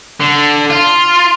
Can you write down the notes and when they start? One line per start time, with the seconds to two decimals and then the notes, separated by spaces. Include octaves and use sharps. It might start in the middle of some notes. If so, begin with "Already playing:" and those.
0.20 D3
0.70 F4